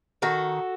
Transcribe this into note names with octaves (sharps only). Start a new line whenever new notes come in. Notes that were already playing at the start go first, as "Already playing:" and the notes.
D#3 F#4 A4